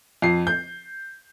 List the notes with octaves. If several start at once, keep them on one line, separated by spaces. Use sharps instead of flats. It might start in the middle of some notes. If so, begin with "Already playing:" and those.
F2 C7
G6